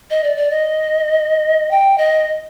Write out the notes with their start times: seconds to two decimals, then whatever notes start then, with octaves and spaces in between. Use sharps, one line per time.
0.10 D#5
0.24 D5
0.37 D5
0.51 D#5
1.71 G5
1.98 D#5